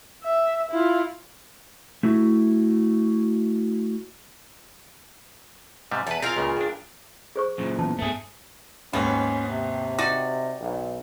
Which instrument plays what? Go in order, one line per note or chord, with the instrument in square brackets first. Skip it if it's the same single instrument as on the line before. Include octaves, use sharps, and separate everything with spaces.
[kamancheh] E5
E4 F4
[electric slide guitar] A3 E4 F#4
[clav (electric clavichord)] G#2 C3 G3
[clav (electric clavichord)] E2 B4 [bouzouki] A5
[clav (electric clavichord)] C4 F5 [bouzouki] F4 G#4 A#4
[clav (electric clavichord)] C#2 A#2 C#3
G2 D4
[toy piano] G#4 C5 C#6
[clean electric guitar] F#2 A#2
[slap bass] E3 B3 [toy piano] A5
[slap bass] G2 B3 [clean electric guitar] A3 G#4
[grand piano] D#2 G#2 [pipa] B3 [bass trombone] C#4
[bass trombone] C3
[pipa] D#4 F#4 D5 [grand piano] A#6
[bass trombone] B1